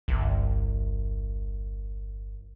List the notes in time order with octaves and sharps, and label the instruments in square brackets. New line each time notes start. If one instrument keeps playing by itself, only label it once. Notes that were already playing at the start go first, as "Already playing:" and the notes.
[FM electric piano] G1 [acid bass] C2